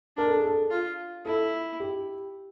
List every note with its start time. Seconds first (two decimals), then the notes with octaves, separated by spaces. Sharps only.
0.17 D4 A#4
0.27 A4
0.37 G#4
0.46 A4
0.71 F4
1.25 E4 A4
1.80 G4